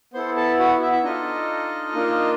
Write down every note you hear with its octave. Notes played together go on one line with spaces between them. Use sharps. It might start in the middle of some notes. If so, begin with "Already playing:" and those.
B3 E4 A4 C5 C6
A4 A5
F#4 F#5
E4 E5
E5
D4 D#4 F4 A4 D#5
A#3 D4 F4